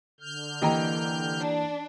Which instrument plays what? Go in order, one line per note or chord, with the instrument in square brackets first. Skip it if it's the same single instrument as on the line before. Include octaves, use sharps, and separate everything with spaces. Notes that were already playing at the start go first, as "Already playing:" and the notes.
[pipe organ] D3 F6 G6
[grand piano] E3 A#3 D#5 [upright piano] G4 G5 A#5
[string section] D4